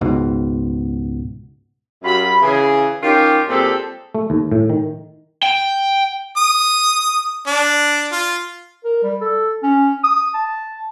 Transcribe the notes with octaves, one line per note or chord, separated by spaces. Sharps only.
C#2 G#2 B2
F#2 F#3 F4 G4 B5
C#3 E3 G#4
D#3 C#4 F4 G4
A#2 G3 G#3 C4 G4 A4
A3
D#2
A2
D#3
G5
D#6
D4
F4
A#4
G3
A4
C#4
D#6
A5